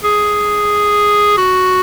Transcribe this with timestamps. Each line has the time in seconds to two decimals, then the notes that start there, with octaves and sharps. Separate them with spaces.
0.04 G#4
1.38 F#4